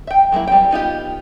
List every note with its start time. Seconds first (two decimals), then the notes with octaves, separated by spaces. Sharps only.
0.07 E5 G5
0.32 F#3 G#3 A#3 E4
0.47 G3 C4 G5
0.71 B3 D#4 F4 G4